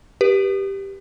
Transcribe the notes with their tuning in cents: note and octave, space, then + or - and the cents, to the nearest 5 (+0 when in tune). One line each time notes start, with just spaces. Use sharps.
G4 +0 B4 -30